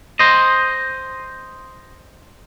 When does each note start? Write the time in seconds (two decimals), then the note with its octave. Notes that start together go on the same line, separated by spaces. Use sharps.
0.19 C5 D#5